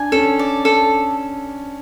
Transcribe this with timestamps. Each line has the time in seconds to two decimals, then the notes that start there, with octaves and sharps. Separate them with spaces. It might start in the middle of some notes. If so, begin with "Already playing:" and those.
Already playing: D4 G#5
0.12 C#4 A4
0.39 D5
0.65 A4